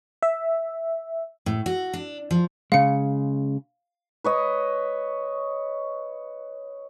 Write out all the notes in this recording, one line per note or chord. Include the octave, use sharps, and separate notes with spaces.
E5
A2
F#4
D4
F3
C#3 G#3 F5 C#7
B4 C#5 D#5